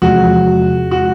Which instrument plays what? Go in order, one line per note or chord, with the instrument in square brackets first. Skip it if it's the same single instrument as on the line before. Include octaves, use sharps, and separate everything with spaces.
[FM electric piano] E2 C3 F3 G#3 [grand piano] F#4
[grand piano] F#4